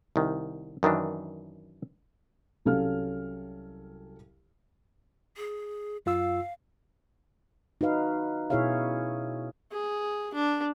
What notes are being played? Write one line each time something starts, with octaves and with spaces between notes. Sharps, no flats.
C2 D#3
F#2 D#3 E3 D4
C2 F#3 C#4 A4 F5 F6
G#4
F#2 F4 F5 E6
D#4 F#4 B4 F5
B2 E4 G#4 C#5 E5 F5
G#4
D4